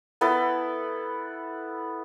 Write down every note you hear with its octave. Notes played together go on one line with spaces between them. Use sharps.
B3 E4 A4 B4